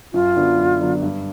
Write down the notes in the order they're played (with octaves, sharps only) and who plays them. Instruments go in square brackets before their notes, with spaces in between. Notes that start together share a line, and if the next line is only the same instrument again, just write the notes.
[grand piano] F#2 [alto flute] F4
[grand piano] D3 F#3 B3 D4
F#2
D3 F#3 B3 D4
G2